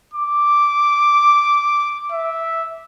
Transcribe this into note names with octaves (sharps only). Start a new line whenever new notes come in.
D6
E5